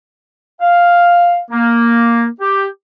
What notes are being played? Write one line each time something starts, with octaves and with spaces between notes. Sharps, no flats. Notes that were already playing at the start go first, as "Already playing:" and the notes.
F5
A#3
G4